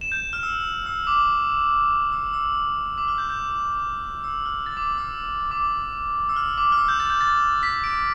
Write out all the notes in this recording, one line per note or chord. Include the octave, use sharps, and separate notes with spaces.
E7
G6
F6
E6
E6
D6
E6
E6
D6
F6
G6
G6
E6
F6
A6
D6
E6
D6
E6
F6
D6
F6
E6
G6
A6
G6
A6
B6
D7